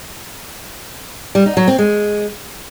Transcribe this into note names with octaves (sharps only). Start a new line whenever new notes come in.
G3
D#4
F#3
C4
G#3